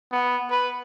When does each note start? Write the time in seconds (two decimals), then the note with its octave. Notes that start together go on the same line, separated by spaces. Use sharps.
0.12 B3
0.51 B4